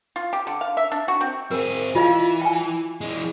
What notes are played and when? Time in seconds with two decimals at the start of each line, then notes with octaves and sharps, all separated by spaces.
0.16 F4
0.33 G4
0.47 D3
0.61 F5
0.77 E5
0.92 D4
1.08 F#4
1.21 C4
1.51 C4 G#4 A#4
1.95 E3 F4 D#5 F5
2.41 G5 G#5
3.01 E3 G#3